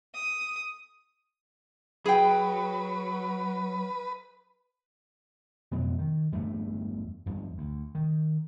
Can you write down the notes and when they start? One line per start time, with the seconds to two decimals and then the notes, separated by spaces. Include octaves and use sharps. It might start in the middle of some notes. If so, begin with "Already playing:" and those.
0.14 D#6
2.06 F#3 G#4 B4 G5
5.71 F2 B2 F3 F#3
5.99 D#3
6.32 E2 G2 G3 A3
7.26 E2 G2
7.58 D2
7.95 D#3